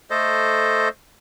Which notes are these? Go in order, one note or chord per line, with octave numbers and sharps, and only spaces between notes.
A3 A4 C5 D#5